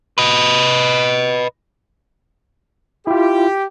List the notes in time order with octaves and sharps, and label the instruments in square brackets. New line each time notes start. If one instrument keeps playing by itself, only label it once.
[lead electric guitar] B4 D#5
[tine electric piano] E4 F4 [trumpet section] G4